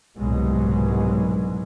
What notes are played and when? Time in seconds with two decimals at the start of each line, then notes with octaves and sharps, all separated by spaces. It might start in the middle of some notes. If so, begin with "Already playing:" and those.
0.17 C2 G#2 B2 F#3 G#3